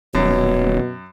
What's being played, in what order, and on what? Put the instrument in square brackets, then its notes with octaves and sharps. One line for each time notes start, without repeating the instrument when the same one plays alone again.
[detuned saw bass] D#1 [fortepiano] F#2 [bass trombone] B2 [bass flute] C#5